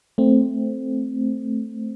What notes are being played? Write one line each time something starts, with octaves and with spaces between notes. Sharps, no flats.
A3 C4